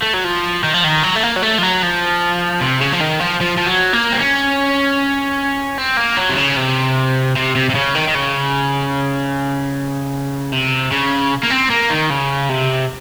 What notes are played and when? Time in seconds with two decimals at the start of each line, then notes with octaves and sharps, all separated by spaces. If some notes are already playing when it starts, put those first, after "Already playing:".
0.02 A3
0.13 F#3
0.24 F3
0.63 D#3
0.74 F3
0.84 D#3
1.03 F#3
1.16 A3
1.23 A#3
1.36 F#3
1.42 A3
1.58 F3
1.63 F#3
1.83 F3
2.61 C3
2.81 C#3
2.93 F3
3.01 D#3
3.20 F3
3.41 F3
3.57 F3
3.67 F#3
3.93 A#3
4.13 C4
4.20 C#4
5.78 C4
5.97 A#3
6.17 F#3
6.29 C3
6.37 C#3
6.57 C3
7.36 C3
7.56 C3
7.70 C3
7.75 C#3
7.95 D#3
8.08 D#3
8.15 C#3
10.52 C3
10.91 C#3
11.43 A#3
11.50 C4
11.70 A#3
11.90 D#3
12.10 C#3
12.49 C3